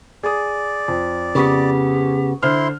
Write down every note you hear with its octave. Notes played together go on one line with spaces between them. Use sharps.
G#4 D5 D#6
F2
C#3 B3 G4
D3 E4 C5 C6 F6